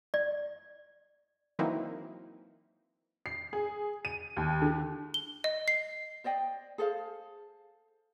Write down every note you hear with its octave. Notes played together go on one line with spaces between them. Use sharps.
D5
E3 F#3 A#3 C4 D#4 E4
C7
G#4
D#7
D#2
D3
G7
D#5
C7
C5 D5 D#5 G5
G#4 A4 C5 F5